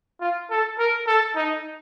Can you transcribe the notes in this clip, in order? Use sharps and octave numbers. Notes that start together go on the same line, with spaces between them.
F4
A4
A#4
A4
D#4